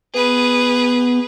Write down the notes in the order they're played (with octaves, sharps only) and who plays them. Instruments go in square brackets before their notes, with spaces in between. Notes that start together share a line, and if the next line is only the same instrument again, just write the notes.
[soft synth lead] B3 [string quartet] G#4 B4